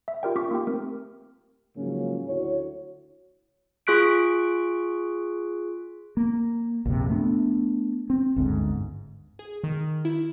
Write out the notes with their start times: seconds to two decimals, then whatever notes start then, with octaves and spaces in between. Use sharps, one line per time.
0.08 E5
0.23 F4 G4 A#4 D5 G5
0.36 C#4 F4 C#6 D6 B6
0.51 A#3 D#4 G4 G5
0.67 A3 C4 A#4
1.77 G#2 C#3 F3 F#3 A#3 C#4
2.28 D2 E4 F#4 C#5
3.87 F4 G#4 C#6 F#6 B6 D7
6.17 A#3
6.85 A#1 F2 C3
7.10 A3 B3 C#4 D4
8.10 C4
8.36 G1 D2 G#2
9.39 G#4
9.64 D#3
10.05 E4